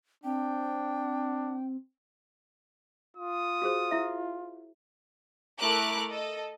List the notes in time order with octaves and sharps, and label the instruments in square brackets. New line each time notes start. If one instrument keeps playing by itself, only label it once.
[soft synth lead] C4 [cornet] D4 [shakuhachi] G5
[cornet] F4 [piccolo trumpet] D#6
[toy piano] F#4 G#4 C5
E4 E5
[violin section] A3 E4 A#4 D6 F#6
A4 D#5